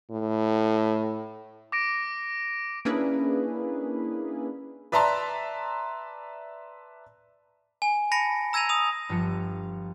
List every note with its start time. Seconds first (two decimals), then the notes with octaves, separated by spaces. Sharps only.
0.11 A2
1.72 D6 A#6 D7
2.85 A#3 C#4 D4 E4 G#4 B4
4.92 B4 D5 E5 A5 A#5 C6
7.82 G#5
8.12 A5 B5 A#6 C#7 D7
8.53 A#5 E6 G#6 A#6 D#7 F7
8.69 D#6 F7
9.09 G1 F3 C#7